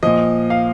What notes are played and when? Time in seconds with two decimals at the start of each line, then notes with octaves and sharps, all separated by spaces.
0.03 A#2 F3 D#5
0.50 F5